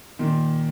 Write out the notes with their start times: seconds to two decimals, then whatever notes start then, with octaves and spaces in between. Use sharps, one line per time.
0.19 A#2 D#3